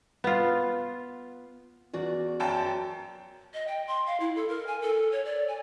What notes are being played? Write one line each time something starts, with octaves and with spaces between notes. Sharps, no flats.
B3 F4
E2 F#4 D5
F#2 G5 A5
D#5
G5
C6
F5
E4
A4
A#4
G#5
A4
C#5
D5
G#5